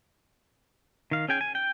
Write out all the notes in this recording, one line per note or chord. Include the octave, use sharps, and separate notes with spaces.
D#3 F5
C#4 G#4 G5 G#5
G#5
G5